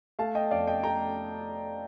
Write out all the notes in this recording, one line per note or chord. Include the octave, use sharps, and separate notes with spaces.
A3 F5 A5
D#5 G5
F2 D5 F5
D#5 G5
A3 G5 A#5